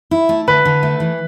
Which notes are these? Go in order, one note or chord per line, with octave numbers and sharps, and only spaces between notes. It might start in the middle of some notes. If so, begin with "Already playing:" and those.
E4
A3
D3 B4
D3
A3
E3